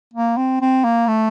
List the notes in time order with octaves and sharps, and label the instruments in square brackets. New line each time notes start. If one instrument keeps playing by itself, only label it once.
[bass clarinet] A#3
C4
C4
A#3
A3